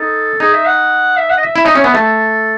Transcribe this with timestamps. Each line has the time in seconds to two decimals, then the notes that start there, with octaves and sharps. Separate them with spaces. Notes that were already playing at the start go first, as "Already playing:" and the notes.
Already playing: D#4 A4
0.40 D#4 G#4
0.53 E5
0.66 F#5
1.17 E5
1.30 F#5
1.37 D#5
1.43 E5
1.56 E4
1.66 D#4
1.75 C#4
1.84 B3
1.94 A3 A4